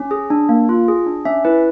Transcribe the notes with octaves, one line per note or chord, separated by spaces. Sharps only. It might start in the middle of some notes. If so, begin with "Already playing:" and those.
Already playing: C#4
G#4
D4
A#3
F4
G#4
D4
C#4 E5
E4 B4